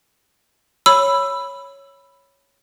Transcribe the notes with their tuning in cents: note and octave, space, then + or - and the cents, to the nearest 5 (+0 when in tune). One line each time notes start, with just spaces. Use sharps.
C#5 +0 B5 +0 E6 +10